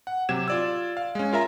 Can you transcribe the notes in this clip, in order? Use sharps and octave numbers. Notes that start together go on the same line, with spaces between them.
F#5
C3 F#3 G4 G#6 E7
F4 D5 E6
F5
G#3 C#4
F4 A#4 E5 A#5